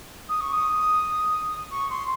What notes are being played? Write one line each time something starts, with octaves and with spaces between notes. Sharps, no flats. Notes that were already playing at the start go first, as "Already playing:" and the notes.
D#6
C#6
D#6
C#6
C6